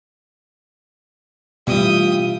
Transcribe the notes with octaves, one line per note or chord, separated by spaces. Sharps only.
G2 B2 E3 A3 F4 G5 D#6